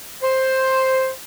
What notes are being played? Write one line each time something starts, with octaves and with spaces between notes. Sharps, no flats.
C5